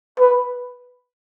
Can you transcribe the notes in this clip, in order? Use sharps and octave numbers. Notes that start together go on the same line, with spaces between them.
B4